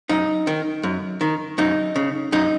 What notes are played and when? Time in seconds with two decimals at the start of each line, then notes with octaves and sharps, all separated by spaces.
0.09 F#2 D#4
0.47 D#3
0.83 F#2
1.21 D#3
1.58 F#2 D#4
1.96 C#3
2.32 F#2 D#4